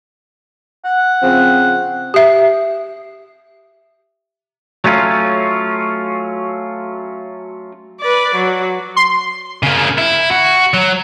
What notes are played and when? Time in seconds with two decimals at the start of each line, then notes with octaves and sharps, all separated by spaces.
0.85 F#5
1.22 C#3 F3 C4
2.14 G4 E5
4.84 F#3 A3 C#4 F4
8.00 B4 D5
8.35 F#3
8.96 C6
9.63 C#3 A#3
9.98 E4
10.31 F#4
10.74 F#3